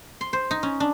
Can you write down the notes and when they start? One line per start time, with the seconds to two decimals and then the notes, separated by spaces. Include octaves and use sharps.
0.21 C6
0.33 C5
0.51 D#4
0.63 C#4
0.80 D4